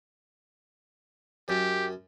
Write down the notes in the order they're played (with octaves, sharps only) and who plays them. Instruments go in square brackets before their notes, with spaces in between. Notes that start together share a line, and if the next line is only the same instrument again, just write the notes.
[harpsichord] F#2 [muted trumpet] G4